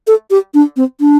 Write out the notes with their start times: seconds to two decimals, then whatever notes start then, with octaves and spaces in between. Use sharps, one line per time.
0.07 A4
0.31 G4
0.54 D4
0.76 C4
1.00 D4